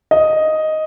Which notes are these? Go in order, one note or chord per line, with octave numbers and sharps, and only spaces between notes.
D#5